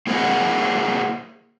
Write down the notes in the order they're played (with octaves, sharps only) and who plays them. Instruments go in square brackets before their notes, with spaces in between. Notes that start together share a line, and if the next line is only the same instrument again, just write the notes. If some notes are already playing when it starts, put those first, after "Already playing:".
[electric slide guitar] A#3 E4 G#4 A#4 C5 F#5